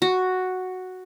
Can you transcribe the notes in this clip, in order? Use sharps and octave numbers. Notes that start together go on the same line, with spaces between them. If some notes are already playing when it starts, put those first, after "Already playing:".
F#4